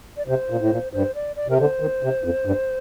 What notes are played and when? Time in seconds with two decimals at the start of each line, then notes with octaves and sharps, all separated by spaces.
0.17 D5
0.27 C3 C5
0.50 A#2
0.60 A2
0.71 A#2
0.93 G2 C5
1.15 D5
1.36 D5
1.48 C3 A#4
1.58 D3 C5
1.80 D#3
2.03 C3
2.24 F2
2.45 G2